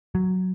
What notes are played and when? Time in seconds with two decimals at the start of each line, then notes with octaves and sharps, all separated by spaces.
0.15 F#3